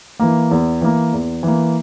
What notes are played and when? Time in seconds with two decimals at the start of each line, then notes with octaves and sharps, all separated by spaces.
0.20 E3 A#3
0.51 E2
0.81 E3 A#3
1.13 E2
1.43 E3 A#3